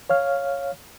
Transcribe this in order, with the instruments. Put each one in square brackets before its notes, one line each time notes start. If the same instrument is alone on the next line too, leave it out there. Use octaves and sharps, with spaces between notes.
[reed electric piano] C#5 F5 F6